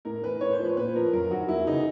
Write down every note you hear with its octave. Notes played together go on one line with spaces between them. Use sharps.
A2 A#4
E3 B4
A2 C#5
C5
F3
B4
A#2 B4
F3 A#4
F#2 A#4
D#3 F#3 F#4
E2 E4
C#3 E3 D#4